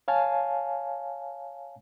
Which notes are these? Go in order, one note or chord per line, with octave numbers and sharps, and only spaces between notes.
C#5 F5 G#5 A5